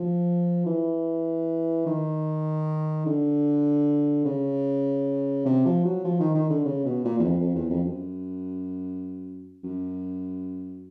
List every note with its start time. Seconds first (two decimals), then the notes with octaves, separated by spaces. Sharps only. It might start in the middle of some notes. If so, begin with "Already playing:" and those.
Already playing: F3
0.66 E3
1.86 D#3
3.06 D3
4.25 C#3
5.45 C3
5.66 F3
5.85 F#3
6.04 F3
6.20 D#3
6.35 D#3
6.50 D3
6.65 C#3
6.85 B2
7.04 A#2
7.19 E2
7.24 F2
7.40 F2
7.55 E2
7.70 F2
7.84 F#2
9.64 F#2